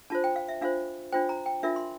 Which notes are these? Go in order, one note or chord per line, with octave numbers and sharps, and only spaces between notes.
D4 F4 C5 A5
G5
F5
E5
D4 F4 C5 F5
D4 F4 C5 G5
A#5
G5
D4 F4 A#4 E5
C6